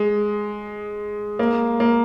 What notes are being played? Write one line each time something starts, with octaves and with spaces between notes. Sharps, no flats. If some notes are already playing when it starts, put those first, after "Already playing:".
Already playing: G#3
A#3
A#3